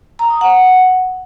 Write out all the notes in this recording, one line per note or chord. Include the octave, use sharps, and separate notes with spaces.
A#5
D#6
F#5